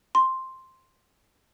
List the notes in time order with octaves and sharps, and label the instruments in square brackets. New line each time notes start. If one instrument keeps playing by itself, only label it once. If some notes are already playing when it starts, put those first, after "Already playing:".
[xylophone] C6